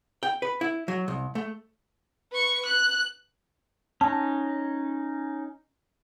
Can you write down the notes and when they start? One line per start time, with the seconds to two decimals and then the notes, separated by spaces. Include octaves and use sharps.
0.23 G5
0.42 B4
0.61 E4
0.88 F#3
1.08 C2
1.35 A3
2.31 B4 C#6
2.66 F#6
4.01 C#4 D#4 A5